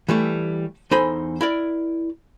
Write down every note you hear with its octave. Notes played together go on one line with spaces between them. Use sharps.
E3 G3 A3
E2 D#4 A4 C5 G#5 B5
E4 A#4 D5